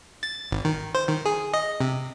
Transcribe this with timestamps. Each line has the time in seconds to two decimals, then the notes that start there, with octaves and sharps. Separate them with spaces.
0.23 A6
0.51 G#1
0.65 D#3
0.95 C5
1.08 D#3
1.26 G#4
1.54 D#5
1.81 C3